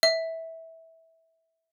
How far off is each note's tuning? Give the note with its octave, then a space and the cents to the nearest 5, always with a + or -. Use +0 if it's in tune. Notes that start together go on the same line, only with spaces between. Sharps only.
E5 -15